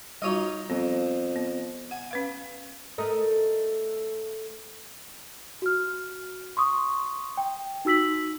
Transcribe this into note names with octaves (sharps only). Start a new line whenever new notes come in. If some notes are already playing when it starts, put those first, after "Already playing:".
G3 D#4 F4 F#4 C#5 D#5
F2 B3
B3
F#5 G#5
C#4 B4 F5
A3 A#4 D#5
F#4 F6
C6 C#6 D#6
G5
D#4 F#4 E6 B6 F#7